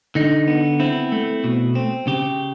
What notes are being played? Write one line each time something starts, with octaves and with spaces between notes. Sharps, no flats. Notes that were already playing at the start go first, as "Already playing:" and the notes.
D3 D#4
B3
C4 E4
A3
B2
C4
C#3 G4